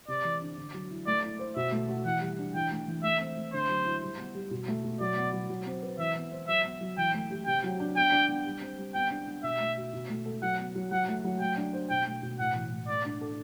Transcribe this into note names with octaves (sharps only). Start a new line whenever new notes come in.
C3 D5
E3
D4
D3
F#3
E4
A3 D5
E4
C5
B2 E5
A3
F#4
E3 F#5
G3
D4
E3 G5
A3
E3
A3 E5
C4
A3
D3 C5
F#3
E4
G3
B3
G3
B2
A3
B2
F#3 D5
B3
F#3
F#3
C4
B4
E3 E5
B3
C5
F#3 E5
B3
F#3
E3 G5
A3
G4
C3 G5
F#3
D4
B3 G5
D4
B3
G3
C4
G3
B3 G5
D4
B3
B2 E5
A3
F#4
B2
A3
A4
F#3 F#5
B3
F#3
F#3 F#5
A3
F#3
A3 G5
D4
C5
B2 G5
A3
B2
A2 F#5
E3
A2
A3 D5
D4
A4